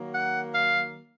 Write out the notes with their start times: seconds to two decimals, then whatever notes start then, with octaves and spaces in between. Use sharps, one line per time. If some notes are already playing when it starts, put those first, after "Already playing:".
Already playing: D#3 F#3 A#3
0.14 F#5
0.53 F5